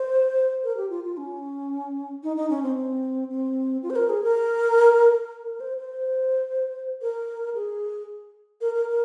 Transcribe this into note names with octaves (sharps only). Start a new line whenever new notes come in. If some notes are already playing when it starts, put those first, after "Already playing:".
Already playing: C5
A#4
G4
F4
F4
C#4
D#4
D#4
C#4
C4
C4
C4
F4
C5
A#4
G#4
A#4
A#4
C5
C5
A#4
G#4
A#4
A#4
A#4